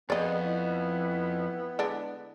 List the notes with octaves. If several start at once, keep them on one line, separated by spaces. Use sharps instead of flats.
F2 B3 G#4 D5 D#5
E4
D3 G#3 D4